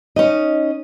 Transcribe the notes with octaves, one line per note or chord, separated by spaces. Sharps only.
C#4 D#4 D#5